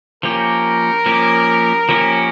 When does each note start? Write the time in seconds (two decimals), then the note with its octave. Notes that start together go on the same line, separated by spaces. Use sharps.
0.23 F3 A#3 C#4 G4 A#4
1.06 F3 A#3 C#4 G4
1.89 F3 A#3 C#4 G4